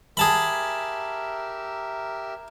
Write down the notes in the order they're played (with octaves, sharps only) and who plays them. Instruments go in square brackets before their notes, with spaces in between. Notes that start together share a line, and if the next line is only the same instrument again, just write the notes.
[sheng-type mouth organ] G4 A#4 E5 [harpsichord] G#4 A5 B5